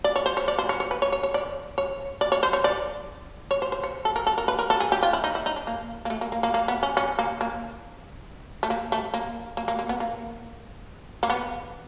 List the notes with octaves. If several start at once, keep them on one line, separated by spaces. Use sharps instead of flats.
D5
C#5
C5
C#5
D5
C5
C#5
C#5
B4
C#5
C#5
C#5
D5
C#5
D5
C#5
C5
C#5
D5
C#5
C5
C5
C#5
A4
A#4
A4
A#4
B4
A#4
A4
G#4
G4
F4
E4
D#4
E4
D#4
D4
A#3
A#3
A3
A#3
A#3
A#3
A#3
B3
C#4
C#4
A#3
A#3
A3
A#3
A3
A#3
A#3
A#3
A#3
B3
A#3
A#3
B3